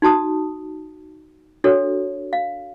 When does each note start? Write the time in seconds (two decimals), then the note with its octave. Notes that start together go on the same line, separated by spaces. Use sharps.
0.02 D#4 F#4 A5 D#6
1.64 D4 F#4 A4 C#5
2.33 F5